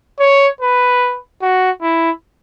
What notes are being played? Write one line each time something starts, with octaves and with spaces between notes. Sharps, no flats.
C#5
B4
F#4
E4